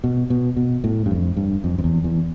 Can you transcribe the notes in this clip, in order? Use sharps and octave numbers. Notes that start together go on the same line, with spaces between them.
B2
B2
B2
A2
G2
F2
G2
F2
F2
E2
E2